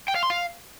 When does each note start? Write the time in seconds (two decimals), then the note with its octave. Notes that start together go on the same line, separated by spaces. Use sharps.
0.08 G5
0.15 F5
0.23 C6
0.30 F5